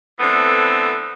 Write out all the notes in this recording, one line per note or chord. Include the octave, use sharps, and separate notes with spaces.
D3 E3 A3 B3 C4